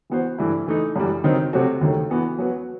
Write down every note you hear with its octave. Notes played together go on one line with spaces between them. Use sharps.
E3 B3 F#4 C5
G2 E3 A3 E4
E3 A3 D#4
F#2 E3 G3
D#3 F#3 C4 D#4
C3 F#3 A3 C4 F#4
D#2 D#3 F#3 A3
E3 B3 F#4
F#3 B3 F#4 B4